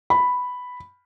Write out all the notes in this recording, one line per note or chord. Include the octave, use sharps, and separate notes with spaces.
B5